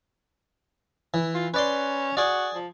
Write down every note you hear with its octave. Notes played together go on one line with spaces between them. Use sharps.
E3
F4
C#4 B4 D5 C6
F#4 G#4 D5
F3